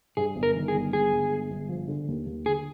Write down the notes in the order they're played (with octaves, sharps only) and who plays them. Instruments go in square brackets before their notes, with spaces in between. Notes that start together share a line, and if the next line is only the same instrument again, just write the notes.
[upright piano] G2 [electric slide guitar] G#4
[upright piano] G1
[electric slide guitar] A#4
[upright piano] D#3
[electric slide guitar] G#4
[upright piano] G1
[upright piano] G#3 [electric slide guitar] G#4
[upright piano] G1
G#3
G1
F3
D3
D#2
D#2
[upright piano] D3 [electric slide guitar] G#4